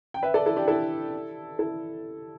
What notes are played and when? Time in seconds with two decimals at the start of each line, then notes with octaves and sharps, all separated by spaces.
0.14 G5
0.23 B4 E5
0.34 A4 D5
0.46 E4 A4
0.56 D4 G4
0.68 E4 A4
1.59 E4 A4